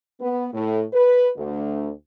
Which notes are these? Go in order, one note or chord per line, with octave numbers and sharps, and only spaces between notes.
B3
A2
B4
D2